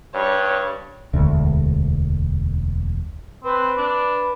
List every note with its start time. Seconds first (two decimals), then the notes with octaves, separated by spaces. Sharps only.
0.15 G2 C#5
1.13 E1 D2
3.44 C4 B4
3.78 D4